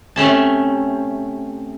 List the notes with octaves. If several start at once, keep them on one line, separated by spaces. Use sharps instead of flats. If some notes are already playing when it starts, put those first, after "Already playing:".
C3 A3 C#4 A5